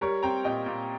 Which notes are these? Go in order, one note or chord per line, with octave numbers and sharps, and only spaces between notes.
G3 A#4 C#5
C4 G5 A#5
A#2 D#5 G5
A#2